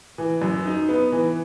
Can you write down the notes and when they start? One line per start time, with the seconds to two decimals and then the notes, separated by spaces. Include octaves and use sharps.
0.18 E3
0.42 F#2
0.65 D#4
0.89 B3
1.12 E3